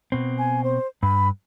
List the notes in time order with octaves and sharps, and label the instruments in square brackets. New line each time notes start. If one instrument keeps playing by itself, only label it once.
[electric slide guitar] B2 C4
[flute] G#5
C5
[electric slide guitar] G2 [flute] B5